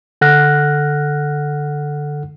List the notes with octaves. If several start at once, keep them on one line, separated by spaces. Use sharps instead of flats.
D3 A4 F#5 F6 F#6 A#6